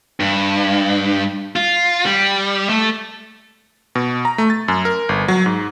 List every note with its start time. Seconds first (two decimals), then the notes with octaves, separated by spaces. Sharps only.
0.20 G2
1.56 F4
2.06 G3
2.69 A3
3.95 B2
4.25 A#5
4.38 A3
4.50 A6
4.68 F#2
4.85 A#4
5.09 G1
5.28 F#3
5.46 G#2